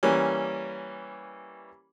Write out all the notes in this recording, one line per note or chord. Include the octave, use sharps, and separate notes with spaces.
E3 G3 A#3 C#4